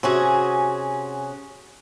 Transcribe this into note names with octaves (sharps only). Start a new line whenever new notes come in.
C3 C#4 F#4 G#4